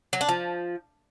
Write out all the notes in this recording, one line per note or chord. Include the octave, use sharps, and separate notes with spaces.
F#3
D4
F3